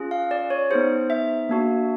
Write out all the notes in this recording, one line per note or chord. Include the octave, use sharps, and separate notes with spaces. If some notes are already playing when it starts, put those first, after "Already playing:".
Already playing: C#4 F4 G#4
F5
D5
C#5
B3 D#4 G#4 C5
E5
A#3 D4 F#4